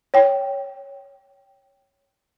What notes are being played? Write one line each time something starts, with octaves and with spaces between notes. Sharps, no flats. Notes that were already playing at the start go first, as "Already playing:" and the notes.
C#5 G5